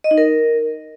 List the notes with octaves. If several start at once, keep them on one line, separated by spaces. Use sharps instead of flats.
D#5
D#4
A#4